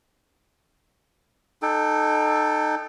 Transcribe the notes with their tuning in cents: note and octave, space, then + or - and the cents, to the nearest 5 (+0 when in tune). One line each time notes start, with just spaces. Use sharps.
D#4 -25 A4 +0 G5 +20